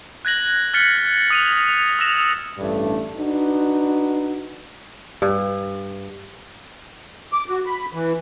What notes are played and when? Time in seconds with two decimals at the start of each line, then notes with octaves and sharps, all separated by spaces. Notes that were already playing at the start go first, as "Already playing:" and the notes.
0.25 F#6 G#6 A#6 F#7
0.74 F6 A6 B6 C#7 F#7 G7
1.30 D#6 D#7 F7
1.99 D#6 E6 A#6 E7 F7
2.58 A1 G2 A3 D4
3.16 D4 D#4 F#4 B4
5.22 G2
7.33 D6
7.49 F#4
7.66 B5
7.93 E3